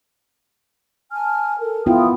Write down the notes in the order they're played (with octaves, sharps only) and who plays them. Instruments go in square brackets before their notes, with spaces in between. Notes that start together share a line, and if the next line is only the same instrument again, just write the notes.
[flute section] G#5 A5 F6
A4 A#4
[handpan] B3 E4 F4 [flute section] G5 D#6